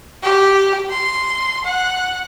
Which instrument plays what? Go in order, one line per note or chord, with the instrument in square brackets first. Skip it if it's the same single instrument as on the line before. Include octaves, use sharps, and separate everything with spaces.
[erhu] G4
C6
F#5